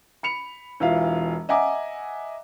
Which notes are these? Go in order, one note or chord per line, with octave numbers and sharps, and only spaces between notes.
B5 C#7 F7
E1 E3 F4 E5 F5
D#5 E5 F#5 G#5 A#5 D6